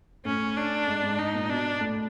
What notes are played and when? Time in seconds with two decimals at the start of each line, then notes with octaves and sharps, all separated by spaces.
0.25 A2 C#4
0.56 D4
0.87 G#2
1.03 G#2
1.18 G#2 D#4
1.34 A#2
1.49 B2 D4
1.80 A2